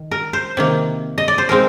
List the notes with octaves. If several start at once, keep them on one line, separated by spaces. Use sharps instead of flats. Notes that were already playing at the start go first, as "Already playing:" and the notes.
Already playing: D#3
A#4
C5
C3 D#3 A#3
D#5
D5
C5
F3 G#3 C4 D#4 A#4